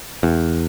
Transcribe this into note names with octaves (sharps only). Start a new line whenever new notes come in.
E2